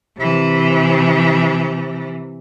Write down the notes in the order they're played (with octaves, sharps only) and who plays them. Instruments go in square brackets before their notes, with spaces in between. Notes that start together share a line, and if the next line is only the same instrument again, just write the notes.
[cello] C3 E3